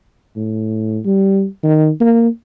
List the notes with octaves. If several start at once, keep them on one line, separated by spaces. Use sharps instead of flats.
A2
G3
D#3
A#3